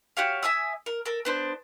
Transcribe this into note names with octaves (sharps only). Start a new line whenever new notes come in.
F#4 G4 C#5 F5
E5 G#5 D#6 E6
A#4
A4 A#4
B3 D4 C5